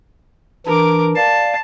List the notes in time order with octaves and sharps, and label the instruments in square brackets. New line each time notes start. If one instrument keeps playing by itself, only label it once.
[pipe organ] E3 D4 [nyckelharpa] A#4 D6
[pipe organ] D5 F5 [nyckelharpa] A5